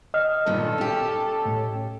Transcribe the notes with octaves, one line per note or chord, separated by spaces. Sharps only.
D#5 F6
G2 A#2 D#3 A4
C#4 G4
A2